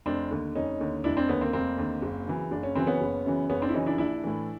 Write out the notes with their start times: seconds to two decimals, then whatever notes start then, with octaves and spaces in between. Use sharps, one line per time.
0.06 F1 C4 D4
0.31 D#2 D3
0.55 F1 C#4 D#4
0.80 D#2 D3
1.04 F1 D4 E4
1.17 C4 D4
1.28 D#2 D3 B3 C#4
1.41 A#3 C4
1.53 F1 A#3 C4
1.78 D#2 D3
2.02 F#1
2.27 F#2 C#3 E3
2.51 F#1 D4
2.63 C#4
2.75 F#2 C#3 E3 C4
2.87 B3 C#4
3.01 F#1
3.26 F#2 C#3 E3
3.50 F#1 B3 C#4
3.62 C4 D4
3.69 E4
3.74 F#2 C#3 E3 C#4 D#4
3.86 D4 E4
3.98 A#1 D4 E4
4.24 A2 E3